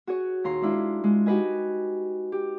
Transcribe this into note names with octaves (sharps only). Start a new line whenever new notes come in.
F#4 G#4 C#5
D#2 A#2 A#5 C6
G#3 D4 E4 F4
G#3
D#4 F#4 G4 B4 D#5 G#5
G4